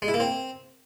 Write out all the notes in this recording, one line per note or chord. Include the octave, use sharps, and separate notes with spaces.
G#3
E4
A#3
C4